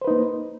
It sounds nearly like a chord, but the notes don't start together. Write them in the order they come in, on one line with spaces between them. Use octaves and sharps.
C5 B4 D#4 A#3